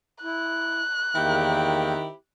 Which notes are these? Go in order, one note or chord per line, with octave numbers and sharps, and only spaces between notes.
E4 F#6
E2 D#3 A#3 C4 E4 G4 G5